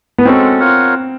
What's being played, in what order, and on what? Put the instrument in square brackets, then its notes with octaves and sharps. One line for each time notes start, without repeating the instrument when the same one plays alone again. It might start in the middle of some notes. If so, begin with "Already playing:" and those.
[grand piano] B3
[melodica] G#3 C#4 F#4 A4 [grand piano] C4
[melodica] F4 A#4 C#5 F#5